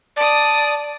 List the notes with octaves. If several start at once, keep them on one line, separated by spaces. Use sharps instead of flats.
D5 A5 D#6